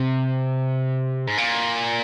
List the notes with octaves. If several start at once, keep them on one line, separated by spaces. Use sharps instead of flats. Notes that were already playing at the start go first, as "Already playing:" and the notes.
Already playing: C3
G#2
A#2